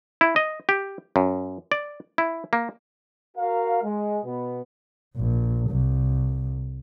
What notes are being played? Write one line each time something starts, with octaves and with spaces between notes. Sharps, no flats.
E4
D#5
G4
F#2
D5
E4
A#3
F#4 A#4 F5
G#3
B2 B3
A#1
C2